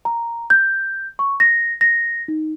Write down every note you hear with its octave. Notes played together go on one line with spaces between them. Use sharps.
A#5
G6
C#6
A#6
A#6
D#4